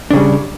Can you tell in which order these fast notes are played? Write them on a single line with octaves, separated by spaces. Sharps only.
D4 C#3 G3